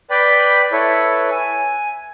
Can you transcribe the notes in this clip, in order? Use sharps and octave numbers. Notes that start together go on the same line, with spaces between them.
B4 D5 G5 B5
E4 A4 B4 C#5
G#5